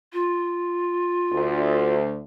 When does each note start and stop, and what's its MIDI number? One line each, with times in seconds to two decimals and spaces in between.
0.13 1.94 65
1.32 2.20 38